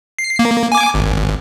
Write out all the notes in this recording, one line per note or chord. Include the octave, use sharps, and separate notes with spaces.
C7
A#3
G#5 D6
G#1